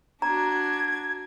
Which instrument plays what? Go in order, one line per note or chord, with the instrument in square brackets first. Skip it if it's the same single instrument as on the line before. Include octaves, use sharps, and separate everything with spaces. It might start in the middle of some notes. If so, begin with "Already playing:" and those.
[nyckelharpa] D4 F#4 [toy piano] A#5 [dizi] G#6